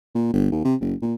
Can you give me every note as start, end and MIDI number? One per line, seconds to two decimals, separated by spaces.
0.15 0.32 46
0.33 0.47 31
0.52 0.60 39
0.65 0.75 48
0.81 0.94 30
1.02 1.15 46